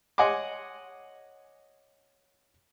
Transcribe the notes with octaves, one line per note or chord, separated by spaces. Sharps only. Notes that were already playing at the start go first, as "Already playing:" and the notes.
C#5 D#5 F#5 G#5 C6 D6